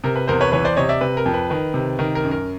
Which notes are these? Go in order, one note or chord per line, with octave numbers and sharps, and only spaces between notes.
C3 A#4
B4
E2 A#4 C5
B4 C#5
E3 B4 C#5
C5 D5
C3 C#5 D#5
D5 E5
C3 B4
A#4
F2
B4
D#3 B4
C3
D#3 A#4
A#4
F#2
A#4